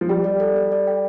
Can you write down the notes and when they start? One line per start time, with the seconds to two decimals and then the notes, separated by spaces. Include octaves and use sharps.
0.01 F3
0.09 G3 G5
0.24 D5
0.40 A4
0.56 A4
0.72 D5
0.87 G5